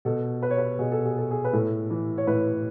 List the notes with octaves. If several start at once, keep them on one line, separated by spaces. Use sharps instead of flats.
B2 A4
B4
C#5
B4
B2 G#4
A4
G#4
A4
G#4
B4
A2 A4
E3
C#5
A2 B4